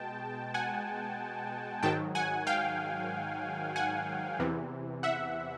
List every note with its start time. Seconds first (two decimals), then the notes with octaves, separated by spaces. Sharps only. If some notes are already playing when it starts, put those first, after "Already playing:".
Already playing: B2 G#3 G5 A5
0.54 F#5 G#5
1.83 G#2 D#3 F#3 G5 A5
2.15 F#5 G#5
2.47 F5 G5
3.76 F#5 G#5
4.39 E2 C3 E3
5.03 E5 F#5